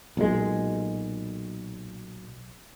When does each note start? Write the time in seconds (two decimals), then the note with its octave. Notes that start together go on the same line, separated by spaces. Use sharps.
0.17 B1 A#2 D3 G#3